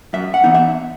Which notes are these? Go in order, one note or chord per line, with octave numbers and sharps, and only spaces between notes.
F#2 E5
F#5
E3 B3 D#4
E5